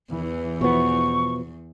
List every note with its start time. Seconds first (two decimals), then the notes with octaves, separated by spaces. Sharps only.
0.11 E2 E3
0.61 B2 F3 B3 C#6